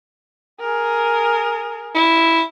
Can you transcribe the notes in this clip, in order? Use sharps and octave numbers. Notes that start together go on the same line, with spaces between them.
G#4 A#4
E4